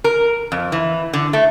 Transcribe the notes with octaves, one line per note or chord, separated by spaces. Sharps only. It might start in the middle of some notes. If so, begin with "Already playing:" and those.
A#4
F2
E3
D3
A3